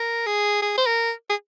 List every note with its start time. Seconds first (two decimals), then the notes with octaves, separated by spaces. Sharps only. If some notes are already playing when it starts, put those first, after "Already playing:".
Already playing: A#4
0.26 G#4
0.62 G#4
0.78 C5
0.86 A#4
1.29 G#4